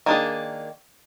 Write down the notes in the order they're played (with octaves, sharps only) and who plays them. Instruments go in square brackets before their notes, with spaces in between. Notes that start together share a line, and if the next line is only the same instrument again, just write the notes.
[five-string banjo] D#3 A#3 D4 G#4